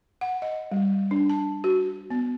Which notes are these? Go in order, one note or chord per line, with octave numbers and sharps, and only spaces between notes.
F#5
D#5
G3
D4
A5
F#4
B3